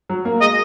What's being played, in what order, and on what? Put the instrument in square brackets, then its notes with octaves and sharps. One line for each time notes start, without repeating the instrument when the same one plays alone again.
[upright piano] F#3
A#3
[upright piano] G#3 [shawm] D#5